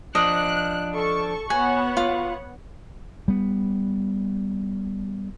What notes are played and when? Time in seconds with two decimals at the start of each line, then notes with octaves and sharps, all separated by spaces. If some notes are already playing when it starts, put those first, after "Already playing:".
0.15 F3 D4 D#5 F#6
0.93 A4 A5 C#6
1.50 B3 F#4 C#5 F#5 G#5
1.97 F4
3.28 G3 B3